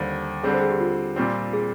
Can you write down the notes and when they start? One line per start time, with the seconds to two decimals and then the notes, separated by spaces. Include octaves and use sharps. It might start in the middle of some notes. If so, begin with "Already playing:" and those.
Already playing: D#2 D3 G3 C5
0.43 D3 G3 C4 G#4
0.54 C5
0.62 G#4
0.71 G4
0.80 F4
1.16 A#2 G3 C4
1.53 G#4